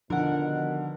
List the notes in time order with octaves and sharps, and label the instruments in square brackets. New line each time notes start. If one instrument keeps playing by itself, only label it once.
[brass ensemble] B2 D#3 [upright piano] D3 [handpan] F3 [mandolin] A#4 F#5